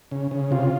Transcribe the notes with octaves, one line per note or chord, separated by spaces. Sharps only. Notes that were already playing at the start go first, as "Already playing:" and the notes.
C#3
C#3
C3 F4